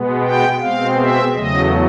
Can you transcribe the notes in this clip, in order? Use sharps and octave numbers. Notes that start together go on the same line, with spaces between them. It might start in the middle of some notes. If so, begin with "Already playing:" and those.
Already playing: B2 G#3 B3
G5
B2 G#3 C4 F5
E5
E2 C#3 F#3 A3 D#5